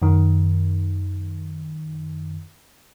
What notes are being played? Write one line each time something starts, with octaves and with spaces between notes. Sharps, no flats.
F#2 D#3